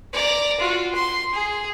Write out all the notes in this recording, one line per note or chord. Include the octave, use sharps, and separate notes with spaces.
D5 A#5
F4 F#4
C6
G#4